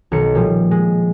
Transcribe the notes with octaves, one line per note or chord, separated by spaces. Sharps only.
B1 D#3 C#7
A#2 F3 G3
G#3